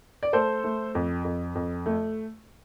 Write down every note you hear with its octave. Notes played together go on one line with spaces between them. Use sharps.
D5
A3 A4 C5
A3
F2
F2
F2
A3